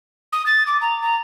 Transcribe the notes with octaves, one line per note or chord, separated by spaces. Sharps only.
D#6
A6
D6
A#5
A#5